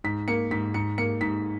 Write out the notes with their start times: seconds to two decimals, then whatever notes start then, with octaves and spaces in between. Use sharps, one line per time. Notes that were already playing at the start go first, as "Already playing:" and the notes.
0.04 G#2 B6
0.28 A#3 C#7
0.51 G#2 B6
0.74 G#2 C#7
0.98 A#3 C#7
1.21 G#2 B6